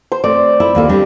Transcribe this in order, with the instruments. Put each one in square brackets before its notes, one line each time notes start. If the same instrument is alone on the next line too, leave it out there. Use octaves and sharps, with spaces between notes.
[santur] C5
[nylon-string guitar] A3 C4 [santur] D5
[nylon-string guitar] E4 [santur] B5
[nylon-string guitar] D#2 A#3 A4
G3 C4 D4